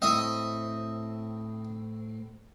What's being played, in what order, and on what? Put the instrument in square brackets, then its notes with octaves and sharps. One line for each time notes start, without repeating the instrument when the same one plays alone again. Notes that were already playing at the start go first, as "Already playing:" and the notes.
[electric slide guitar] A2 C4 [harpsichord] D#5 E5 D#6